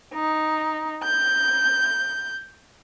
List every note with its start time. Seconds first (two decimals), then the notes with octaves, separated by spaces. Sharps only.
0.14 D#4
1.03 G6